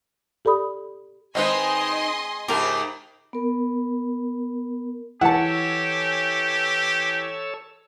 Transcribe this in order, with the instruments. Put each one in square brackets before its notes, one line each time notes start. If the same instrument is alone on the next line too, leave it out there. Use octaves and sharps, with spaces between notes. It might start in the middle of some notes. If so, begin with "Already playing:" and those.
[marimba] G4 A4 D5 B5 D#6
[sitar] D#3 D#4 [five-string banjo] G#3 C4 B4 [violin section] D#5 G#5 C6
[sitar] G#2 C#3 F4 [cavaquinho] G4 A#4
[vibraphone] B3 A#4
[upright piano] E3 [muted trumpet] G4 [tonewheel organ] A4 C#5 E6 [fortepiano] F#5 A5